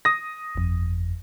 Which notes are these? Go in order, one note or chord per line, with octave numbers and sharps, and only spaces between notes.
D#6 A#6
G1 F2